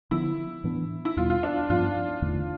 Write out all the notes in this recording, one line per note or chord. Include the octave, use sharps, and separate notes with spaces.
D3 F3 B3 E4
A2 E3 B3 D4
E4
E2 B2 G3 B3 F4
F4
D4
G2 F3 B3 F4
E2 D3 A3